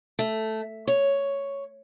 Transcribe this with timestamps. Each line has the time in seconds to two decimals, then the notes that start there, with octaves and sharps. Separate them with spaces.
0.19 A3
0.87 C#5